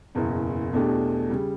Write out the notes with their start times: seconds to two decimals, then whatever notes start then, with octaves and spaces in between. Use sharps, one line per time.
0.15 F#1 E2 B2
0.73 E2 B2 A3 D4 G4
1.30 C#3 G3